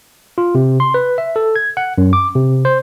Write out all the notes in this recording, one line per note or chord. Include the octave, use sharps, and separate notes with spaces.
F4
C3
C6
B4
E5
A4
G#6
F#5
F#2
D6
C3
C5